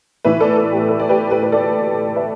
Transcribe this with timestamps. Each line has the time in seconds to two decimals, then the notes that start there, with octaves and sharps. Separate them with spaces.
0.25 A2 E3 B4 E5
0.40 A4 D5
0.57 A4
0.72 G4
0.89 A4
1.00 D5
1.09 G4 B4
1.31 G4 B4
1.43 B4
1.52 A4 D5
2.16 B4 E5